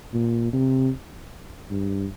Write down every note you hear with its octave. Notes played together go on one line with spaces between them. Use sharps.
A#2
C3
G2